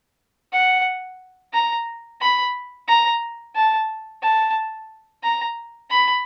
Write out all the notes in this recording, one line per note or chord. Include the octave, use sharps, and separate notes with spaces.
F#5
A#5
B5
A#5
A5
A5
A#5
B5